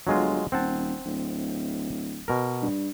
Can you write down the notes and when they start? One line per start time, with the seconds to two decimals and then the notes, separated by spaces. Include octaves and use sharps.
0.07 G1 F#3 G#3 F4
0.52 D#1 C4 F#5 A5
1.05 D1
2.28 B2 A#4
2.62 G2